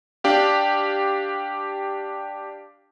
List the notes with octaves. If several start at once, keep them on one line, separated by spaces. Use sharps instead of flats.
D4 G4 F5